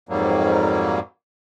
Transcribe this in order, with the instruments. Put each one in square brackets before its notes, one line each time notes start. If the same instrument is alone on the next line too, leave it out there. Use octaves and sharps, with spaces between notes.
[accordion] F2 G#2 F#3 G3 A#3